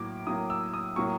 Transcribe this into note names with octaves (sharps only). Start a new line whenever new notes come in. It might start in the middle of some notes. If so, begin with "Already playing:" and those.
Already playing: A2 F#3 A#3 D6
A2 F#3 A#3 D#6
E6
D#6
A2 F#3 A#3 C#6